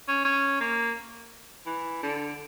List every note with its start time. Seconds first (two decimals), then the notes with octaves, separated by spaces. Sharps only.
0.08 C#4
0.25 C#4
0.61 A#3
1.66 E3
2.03 D3